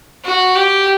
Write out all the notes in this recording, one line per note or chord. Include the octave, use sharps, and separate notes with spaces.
F#4
G4